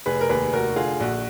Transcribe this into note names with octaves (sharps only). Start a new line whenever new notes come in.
F1 G#4 B4
A#4
D#2 G#4 B4
F1 F#4 A#4
D3 F4 G#4
A#1 F#4